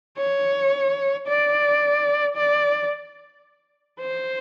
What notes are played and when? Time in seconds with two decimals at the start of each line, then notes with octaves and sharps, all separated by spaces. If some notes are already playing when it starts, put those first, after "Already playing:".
0.18 C#5
1.28 D5
2.36 D5
4.00 C5